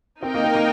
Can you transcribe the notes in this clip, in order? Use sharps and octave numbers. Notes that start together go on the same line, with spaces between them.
C4 D#4 A#4 D#5 G5
A#3
C4
A#3